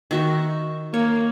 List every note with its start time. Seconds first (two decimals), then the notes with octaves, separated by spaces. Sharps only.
0.11 D#3 F#4 E5
0.94 A#3 C#5